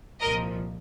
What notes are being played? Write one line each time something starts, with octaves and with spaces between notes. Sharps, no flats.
C2 A#2 F3 A#4 D#5